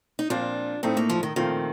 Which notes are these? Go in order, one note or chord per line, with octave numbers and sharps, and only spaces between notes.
D#4
A#2 F3 C4 D4 F4
A2 A3 C4 D#4 A4
A#3
F3
D#3
A#2 D#3 F3 A3 C4 F4